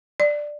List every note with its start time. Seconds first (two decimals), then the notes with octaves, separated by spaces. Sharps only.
0.20 D5